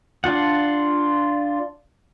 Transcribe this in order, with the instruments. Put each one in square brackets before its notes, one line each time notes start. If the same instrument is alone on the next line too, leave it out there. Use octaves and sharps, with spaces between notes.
[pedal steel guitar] D4 F4 F#5